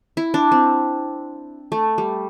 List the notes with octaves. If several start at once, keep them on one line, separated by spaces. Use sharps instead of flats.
E4
D4
C4
A3
G3